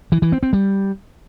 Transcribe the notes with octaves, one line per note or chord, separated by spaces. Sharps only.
E3
E3
C4
C4
G3